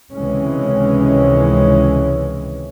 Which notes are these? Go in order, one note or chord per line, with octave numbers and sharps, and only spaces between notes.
C#2 C3 D#3 E3 G#3 C#4